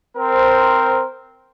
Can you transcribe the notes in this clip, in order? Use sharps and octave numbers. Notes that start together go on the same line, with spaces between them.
C4 A#4 C5